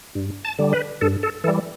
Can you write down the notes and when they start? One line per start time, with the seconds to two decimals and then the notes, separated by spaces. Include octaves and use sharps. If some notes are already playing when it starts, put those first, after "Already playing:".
0.15 G2
0.45 A5
0.59 D3 G3
0.73 B4
1.01 G2 A4
1.23 A4
1.44 E3 A4
1.48 G3